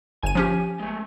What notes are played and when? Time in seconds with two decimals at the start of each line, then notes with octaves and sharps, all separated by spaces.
0.23 G1 G#5 D#7
0.35 F3 C#4 G4
0.79 G#3 A3